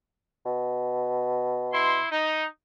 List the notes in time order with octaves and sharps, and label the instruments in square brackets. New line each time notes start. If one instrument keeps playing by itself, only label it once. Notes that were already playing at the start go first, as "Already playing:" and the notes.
[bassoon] B2
[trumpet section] E4 C6
D#4